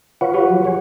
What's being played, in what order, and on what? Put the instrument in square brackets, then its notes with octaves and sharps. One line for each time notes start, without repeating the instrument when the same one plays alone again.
[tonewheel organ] F4 B4 C#5 [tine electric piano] F5 F#5
[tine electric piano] F#4 G4 F#5
[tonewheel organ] F3 F#3
G#4 C#5